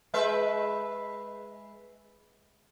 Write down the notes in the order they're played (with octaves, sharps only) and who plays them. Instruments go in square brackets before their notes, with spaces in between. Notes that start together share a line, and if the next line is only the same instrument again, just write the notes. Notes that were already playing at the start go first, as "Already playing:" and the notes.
[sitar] G#3 B4 E5